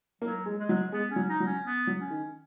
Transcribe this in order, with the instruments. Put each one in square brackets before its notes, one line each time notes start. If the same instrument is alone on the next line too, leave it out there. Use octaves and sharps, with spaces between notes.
[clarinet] F#3 [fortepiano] A#3
[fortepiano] G#3
[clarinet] G#3
[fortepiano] F#3
[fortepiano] G#3 [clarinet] B3
[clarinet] C#4
[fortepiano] F#3
[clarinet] D#4
[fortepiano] F#3
[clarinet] C#4
B3
[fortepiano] F#3
[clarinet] C#4
[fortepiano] D#3